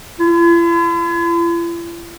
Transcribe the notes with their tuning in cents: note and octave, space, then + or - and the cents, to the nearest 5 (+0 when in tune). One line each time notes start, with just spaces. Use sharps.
E4 +45